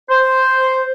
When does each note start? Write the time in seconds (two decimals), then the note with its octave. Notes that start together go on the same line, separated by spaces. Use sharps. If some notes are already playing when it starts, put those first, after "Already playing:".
0.11 C5